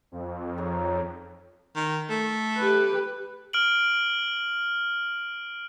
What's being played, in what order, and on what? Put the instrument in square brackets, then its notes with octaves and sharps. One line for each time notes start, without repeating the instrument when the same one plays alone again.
[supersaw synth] F2
[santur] D#4 G#4 C#5
[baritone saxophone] D#3
A3
[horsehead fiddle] G4 B4
[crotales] F6 D7 F#7